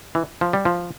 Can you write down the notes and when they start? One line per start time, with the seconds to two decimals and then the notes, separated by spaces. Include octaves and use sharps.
0.15 E3
0.41 F3
0.53 G3
0.65 F3